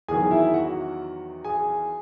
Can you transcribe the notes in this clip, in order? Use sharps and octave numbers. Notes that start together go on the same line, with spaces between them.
E2 D#3 F#3 G#4 G#5
E4 E5
F#4 F#5
G#4 G#5